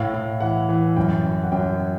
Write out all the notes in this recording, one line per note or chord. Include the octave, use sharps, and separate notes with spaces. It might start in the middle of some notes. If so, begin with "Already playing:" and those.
Already playing: A2 F5
A2
E3 F#5
E3
F#2 G5
F#2
F#5
F#2 G5